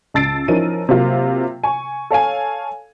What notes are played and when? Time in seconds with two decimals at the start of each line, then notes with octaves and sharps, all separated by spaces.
0.14 C#2 A5 E6 A6 C7 D7
0.48 F3 C#4 D#4 E4 A#4 D#7
0.89 C3 F#3 A#3 F4
1.64 G#5 C#6
2.10 A4 C#5 F5 G#5